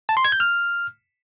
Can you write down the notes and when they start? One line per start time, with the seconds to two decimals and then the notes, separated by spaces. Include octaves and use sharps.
0.09 A5
0.17 C6
0.25 G#6
0.32 G6
0.40 F6